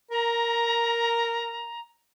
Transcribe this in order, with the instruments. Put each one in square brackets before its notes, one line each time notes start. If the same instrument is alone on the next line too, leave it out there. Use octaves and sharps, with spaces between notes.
[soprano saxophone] A#4 [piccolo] A#5